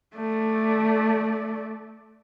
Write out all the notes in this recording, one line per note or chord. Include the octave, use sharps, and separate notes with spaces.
A3 D5